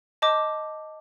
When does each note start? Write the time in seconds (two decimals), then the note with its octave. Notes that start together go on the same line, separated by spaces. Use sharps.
0.22 D#5 A5 D6 G6